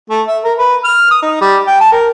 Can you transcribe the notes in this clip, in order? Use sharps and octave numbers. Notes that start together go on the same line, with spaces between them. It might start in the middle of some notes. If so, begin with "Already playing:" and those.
A3
E5
A#4
B4
F6
D#6
D#4
G3
G5
A5
A#4